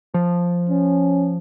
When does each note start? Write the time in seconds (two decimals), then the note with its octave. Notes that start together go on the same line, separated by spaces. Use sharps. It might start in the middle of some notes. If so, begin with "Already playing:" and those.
0.14 F3
0.69 C#4